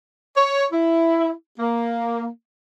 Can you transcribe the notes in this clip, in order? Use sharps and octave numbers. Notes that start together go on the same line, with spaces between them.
C#5
E4
A#3